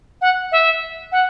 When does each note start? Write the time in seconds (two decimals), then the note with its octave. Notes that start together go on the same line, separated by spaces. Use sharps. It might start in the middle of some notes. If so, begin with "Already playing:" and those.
0.21 F#5
0.51 E5
1.12 F#5